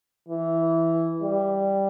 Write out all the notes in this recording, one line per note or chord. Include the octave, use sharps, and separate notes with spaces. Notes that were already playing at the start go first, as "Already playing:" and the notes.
E3
G3